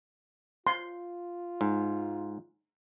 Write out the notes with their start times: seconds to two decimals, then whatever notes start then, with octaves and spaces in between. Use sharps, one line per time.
0.67 F4 C6
1.61 G#2